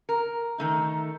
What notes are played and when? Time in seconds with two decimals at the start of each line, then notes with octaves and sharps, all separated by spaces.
0.09 A#4
0.58 D#3 A3 D#4